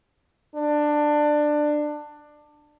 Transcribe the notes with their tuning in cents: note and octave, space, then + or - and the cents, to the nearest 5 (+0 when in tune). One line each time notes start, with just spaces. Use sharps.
D4 +15